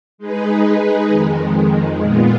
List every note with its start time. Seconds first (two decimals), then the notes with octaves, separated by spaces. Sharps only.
0.18 G#3 D#4 G#4 B4
1.09 F2 D#3 G#3
2.00 A#2 G#3 B3 F4